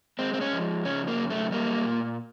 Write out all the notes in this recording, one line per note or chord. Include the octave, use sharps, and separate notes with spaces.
G#3 C4
C4
C#4
F3
C#3 C#4
A#3
F#2
A3
G3 A#3
A#2